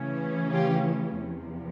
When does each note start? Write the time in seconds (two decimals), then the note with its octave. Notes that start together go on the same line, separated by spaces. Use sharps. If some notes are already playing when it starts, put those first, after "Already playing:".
Already playing: C#3 E3 A3 C#4
0.52 F4 G4
1.21 E2 C3 F3